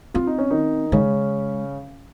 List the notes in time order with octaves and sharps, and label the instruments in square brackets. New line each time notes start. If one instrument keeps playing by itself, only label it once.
[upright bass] C4 [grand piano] F4
[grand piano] D#4
C#4
D#3 D#4
[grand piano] C#3 C#4 [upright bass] G#3